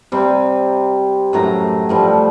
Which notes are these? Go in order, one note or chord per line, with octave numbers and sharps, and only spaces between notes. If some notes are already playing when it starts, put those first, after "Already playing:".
C3 G3
F#2 A2 A#5
A2 F3 G3